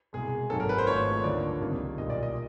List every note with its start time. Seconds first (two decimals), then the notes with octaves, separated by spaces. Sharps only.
0.13 C2 B2 G#3 G#4
0.50 G#1 F#2 D#3 F#3 A#3 A4
0.60 A#4
0.69 B4
0.78 C5
0.87 G#1 G#2 F3 A3 C#5
1.24 D2 D3 F3 A#3 D5
1.61 C#2 C3 D#3 G3 A#3
1.98 B1 A#2 G3 D#5
2.10 D5
2.23 D#5